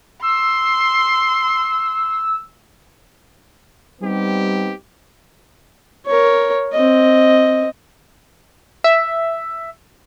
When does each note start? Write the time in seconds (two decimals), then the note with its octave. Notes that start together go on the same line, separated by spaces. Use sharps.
0.22 C6 E6
4.02 G3 B3 C4 D#4 G4
6.06 A#4 C#5
6.73 C4 D#5
8.84 E5